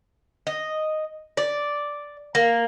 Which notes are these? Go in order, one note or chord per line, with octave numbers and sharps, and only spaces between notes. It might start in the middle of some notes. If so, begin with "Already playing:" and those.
D#5
D5
A#3